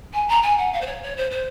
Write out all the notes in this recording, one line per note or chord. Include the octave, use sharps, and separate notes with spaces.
G#5
A#5
G#5
F#5
F5
C5
C#5
C#5
C5
C5